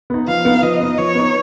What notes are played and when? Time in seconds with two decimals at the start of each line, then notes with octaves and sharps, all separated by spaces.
0.10 B3 D#4
0.28 F3 F5
0.45 B3 D#4
0.62 F3 D#5
0.80 B3 D#4
0.98 F3 C#5
1.15 B3 D#4